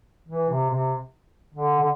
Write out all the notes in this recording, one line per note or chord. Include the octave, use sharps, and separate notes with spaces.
E3
C3
C3
D3
D3